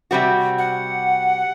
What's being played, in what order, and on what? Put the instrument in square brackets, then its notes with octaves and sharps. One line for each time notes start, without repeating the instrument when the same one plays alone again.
[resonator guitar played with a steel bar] C3 G3 C4 F#4
[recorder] F#5